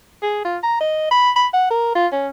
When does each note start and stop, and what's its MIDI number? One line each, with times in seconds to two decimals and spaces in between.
0.23 0.42 68
0.44 0.58 65
0.63 0.78 82
0.80 1.07 75
1.11 1.30 83
1.36 1.47 83
1.53 1.68 78
1.71 1.94 70
1.95 2.07 65
2.12 2.28 61